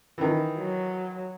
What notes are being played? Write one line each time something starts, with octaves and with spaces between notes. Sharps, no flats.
D#3 E3
F#3